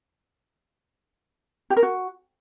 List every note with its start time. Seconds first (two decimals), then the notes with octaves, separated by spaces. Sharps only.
1.70 G4
1.77 A#4
1.83 F#4